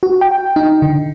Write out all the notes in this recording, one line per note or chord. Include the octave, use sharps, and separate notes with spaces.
F#4
G5
D#4
D3